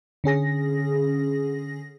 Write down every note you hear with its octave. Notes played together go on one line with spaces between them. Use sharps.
D3 C#4 G#4 A#6